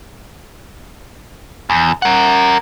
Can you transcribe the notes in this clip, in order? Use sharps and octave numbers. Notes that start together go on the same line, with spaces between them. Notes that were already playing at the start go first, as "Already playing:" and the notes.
E2
A#4 F#5